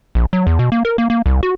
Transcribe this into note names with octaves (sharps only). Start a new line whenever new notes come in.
A#1
F#3
E2
B2
A#3
A#4
A#3
A#3
C2
F#4